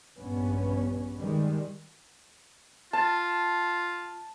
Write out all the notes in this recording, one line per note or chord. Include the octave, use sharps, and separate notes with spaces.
A#1 G2 B3 C#4
D#3 G3 G#3
F4 A5